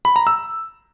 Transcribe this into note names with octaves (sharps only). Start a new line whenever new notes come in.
B5
A#5
E6